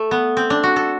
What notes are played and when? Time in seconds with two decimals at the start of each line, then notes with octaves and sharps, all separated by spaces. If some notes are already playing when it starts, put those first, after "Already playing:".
Already playing: A3
0.11 B3
0.37 C4
0.50 D4
0.63 F#4
0.76 A4